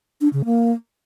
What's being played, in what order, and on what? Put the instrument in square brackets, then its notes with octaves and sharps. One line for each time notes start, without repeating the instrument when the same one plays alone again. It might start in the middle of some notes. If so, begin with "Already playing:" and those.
[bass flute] D4
C#3
A#3